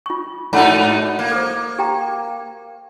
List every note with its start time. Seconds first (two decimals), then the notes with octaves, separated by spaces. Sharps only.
0.06 F4 C#6
0.53 G#2 D#4 F#4 F#5 A#5
1.19 A#3
1.31 A4 C5
1.79 G4 G5 A#5